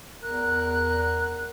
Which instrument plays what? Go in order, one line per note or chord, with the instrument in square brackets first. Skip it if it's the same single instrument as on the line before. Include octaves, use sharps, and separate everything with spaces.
[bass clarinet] E2 [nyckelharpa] A#4 [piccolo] F#6